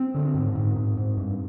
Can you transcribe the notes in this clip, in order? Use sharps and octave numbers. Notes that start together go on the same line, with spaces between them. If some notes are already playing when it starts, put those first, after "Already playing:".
Already playing: C4
D3
G#2
G#2
G#2
G#2
G2